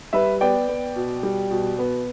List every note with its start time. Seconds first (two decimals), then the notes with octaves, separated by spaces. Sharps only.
0.13 G3 B4 E5
0.41 B3 D5 G5
0.68 B3
0.96 B2
1.23 G3
1.50 B2
1.79 B3